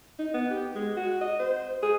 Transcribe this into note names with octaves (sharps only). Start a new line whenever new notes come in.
D#4
B3
G4
G#3
F#4
D#5
C5
G#4